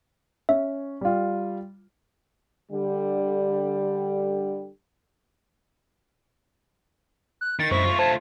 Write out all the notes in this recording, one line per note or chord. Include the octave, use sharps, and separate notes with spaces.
C#4 E5
G3 F4
D3 G3
F#6
D#3 A6
F#2 G#3 E4 C5 C#6
A3 F4
C5 A5 G#6